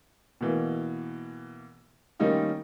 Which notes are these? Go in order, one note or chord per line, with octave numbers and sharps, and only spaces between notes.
B2 E3 A#3
D#3 G3 A#3 C#4 D#4 F4